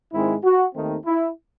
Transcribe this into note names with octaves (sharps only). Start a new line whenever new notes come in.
G#2 D#3 G#3 C4 E4
F#4
D#2 D#3 A3 C4 D#4
E4